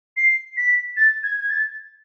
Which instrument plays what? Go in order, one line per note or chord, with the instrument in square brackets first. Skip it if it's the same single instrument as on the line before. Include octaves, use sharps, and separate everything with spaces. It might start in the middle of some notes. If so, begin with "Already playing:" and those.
[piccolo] C7
B6
A6
G#6
G#6
A6